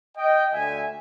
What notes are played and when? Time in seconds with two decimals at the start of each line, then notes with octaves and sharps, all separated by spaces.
0.17 D#5 G5
0.53 D2 E5 G#5